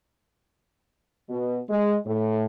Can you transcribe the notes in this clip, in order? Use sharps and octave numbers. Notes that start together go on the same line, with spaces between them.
B2
G#3
A2